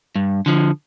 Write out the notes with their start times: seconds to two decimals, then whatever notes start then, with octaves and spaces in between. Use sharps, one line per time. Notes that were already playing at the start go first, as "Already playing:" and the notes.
0.16 G2
0.46 D3 F3